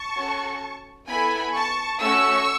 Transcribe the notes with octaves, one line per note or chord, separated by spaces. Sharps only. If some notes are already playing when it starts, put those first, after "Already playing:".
Already playing: A5 C#6
C#4 F#4 A4
B3 E4 A4 G#5 B5
A5 C#6
A3 C#4 F#4 C#6 E6